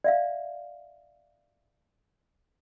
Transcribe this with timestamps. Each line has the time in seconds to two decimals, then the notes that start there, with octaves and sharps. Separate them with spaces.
0.04 D5 E5 F5